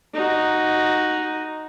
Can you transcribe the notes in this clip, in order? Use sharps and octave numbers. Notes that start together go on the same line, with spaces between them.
D#4 F#4